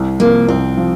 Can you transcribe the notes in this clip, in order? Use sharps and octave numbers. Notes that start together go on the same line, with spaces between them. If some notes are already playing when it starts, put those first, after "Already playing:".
Already playing: C2
C3 F3 A#3
C2 C4
F3